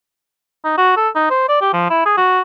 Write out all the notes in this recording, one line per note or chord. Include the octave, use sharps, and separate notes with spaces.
D#4
F#4
A4
D#4
C5
D5
G4
F3
E4
G#4
F#4